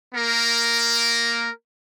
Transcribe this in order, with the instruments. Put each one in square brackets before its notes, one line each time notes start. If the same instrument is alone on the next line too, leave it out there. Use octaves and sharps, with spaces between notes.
[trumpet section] A#3 A#4